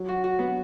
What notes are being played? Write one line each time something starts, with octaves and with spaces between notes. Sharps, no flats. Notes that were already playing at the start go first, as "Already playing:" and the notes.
Already playing: F#3
F#4
F#4
B3